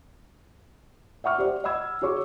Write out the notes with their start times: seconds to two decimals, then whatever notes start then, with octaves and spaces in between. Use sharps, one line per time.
1.24 E5 F#5 C#6 F6
1.38 G4 C5 D5
1.64 D#5 F#5 B5 E6 G#6
2.02 F#4 G#4 C#5 C#6 D6